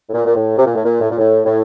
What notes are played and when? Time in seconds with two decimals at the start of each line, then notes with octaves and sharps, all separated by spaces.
0.08 A2
0.14 A#2
0.26 A#2
0.36 A2
0.58 C3
0.66 A#2
0.75 A2
0.84 A#2
1.01 A2
1.11 A#2
1.19 A2
1.45 A2